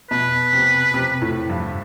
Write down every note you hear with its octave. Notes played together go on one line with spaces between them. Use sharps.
B2 B4
C3
C3
A2
G2